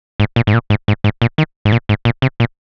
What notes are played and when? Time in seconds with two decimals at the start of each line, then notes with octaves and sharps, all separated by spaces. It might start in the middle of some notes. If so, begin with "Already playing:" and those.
0.20 G#2
0.36 A#2
0.47 G#2
0.54 A#2
0.70 G#2
0.88 G#2
1.04 G#2
1.22 A#2
1.38 D#3
1.65 G#2
1.72 A#2
1.89 G#2
2.05 A#2
2.22 C3
2.40 A#2